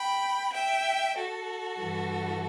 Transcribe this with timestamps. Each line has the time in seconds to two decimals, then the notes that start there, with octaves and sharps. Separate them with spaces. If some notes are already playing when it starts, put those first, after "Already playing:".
Already playing: G5 B5
0.53 E5 G5
1.16 F#4 A4
1.78 G2 E3 G3